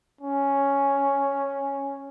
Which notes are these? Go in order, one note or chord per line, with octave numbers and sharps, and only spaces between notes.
C#4